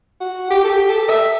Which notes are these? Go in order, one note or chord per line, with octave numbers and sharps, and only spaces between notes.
F#4
G4
A4
G4
A4
E5